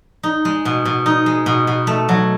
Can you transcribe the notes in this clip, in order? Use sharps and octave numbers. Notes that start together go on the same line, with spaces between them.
D#4
G#3
B2
B2
D#4
G#3
B2
B2
A3
F#3